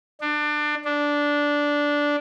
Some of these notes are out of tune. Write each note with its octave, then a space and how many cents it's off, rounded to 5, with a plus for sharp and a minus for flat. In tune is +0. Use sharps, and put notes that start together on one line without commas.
D4 +25
D4 -10